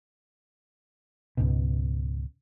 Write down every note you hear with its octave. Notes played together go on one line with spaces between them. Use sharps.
C#2 G#2 B2